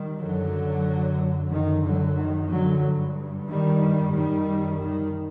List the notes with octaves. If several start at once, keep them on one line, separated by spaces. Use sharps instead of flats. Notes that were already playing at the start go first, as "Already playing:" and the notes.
Already playing: D#3 G3
F#2 D3 F#3
F#2 D#3
D3 F#3
D#3
D3 F#3
G2
D#3 G3
F#2 D#3 G3
D#3